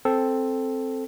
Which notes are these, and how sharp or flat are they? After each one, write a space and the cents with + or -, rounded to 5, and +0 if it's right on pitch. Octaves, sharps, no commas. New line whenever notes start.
C4 +5 A4 +0